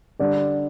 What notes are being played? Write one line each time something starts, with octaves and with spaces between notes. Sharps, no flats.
D3 G3 D5